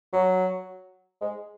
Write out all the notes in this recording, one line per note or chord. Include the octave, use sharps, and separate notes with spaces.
F#3
G#3